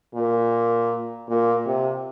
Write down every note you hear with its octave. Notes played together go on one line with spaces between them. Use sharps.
A#2
A#2
C3